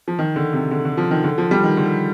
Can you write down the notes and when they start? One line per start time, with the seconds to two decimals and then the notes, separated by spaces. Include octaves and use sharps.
0.08 F3
0.19 D#3
0.36 D3
0.53 C3
0.71 D3
0.85 D3
0.98 F3
1.11 D#3
1.24 D3
1.38 F3
1.51 G3
1.64 D#3
1.77 D3